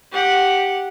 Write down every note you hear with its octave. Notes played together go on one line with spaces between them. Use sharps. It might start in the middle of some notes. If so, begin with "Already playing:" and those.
G4 F#5